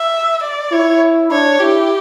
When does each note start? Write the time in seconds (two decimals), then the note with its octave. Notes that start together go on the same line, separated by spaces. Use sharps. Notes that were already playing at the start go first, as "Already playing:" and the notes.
Already playing: E5
0.43 D5
0.72 E4 C#5
1.31 D4 C#5
1.60 E4 G4